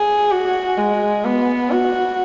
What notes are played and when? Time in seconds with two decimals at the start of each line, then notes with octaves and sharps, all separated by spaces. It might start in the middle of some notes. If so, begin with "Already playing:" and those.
Already playing: G#4
0.31 F#4
0.78 G#3
1.25 B3
1.72 F#4